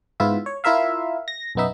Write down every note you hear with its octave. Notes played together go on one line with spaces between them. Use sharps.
G#2 B3 E4 F4 E5
C#5
E4 F4 A#4 E5 F5
A#6
B1 F#2 B3 D#4 E5